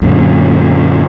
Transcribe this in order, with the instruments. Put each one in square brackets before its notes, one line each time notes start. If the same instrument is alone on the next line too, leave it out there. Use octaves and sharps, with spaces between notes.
[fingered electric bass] F#2 A#2 D3